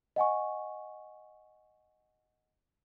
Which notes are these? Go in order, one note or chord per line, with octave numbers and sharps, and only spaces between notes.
D#5 F#5 G#5 C#6